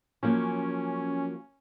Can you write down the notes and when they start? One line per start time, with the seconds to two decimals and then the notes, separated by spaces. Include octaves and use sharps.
0.23 F3 F#3 A#3 C#4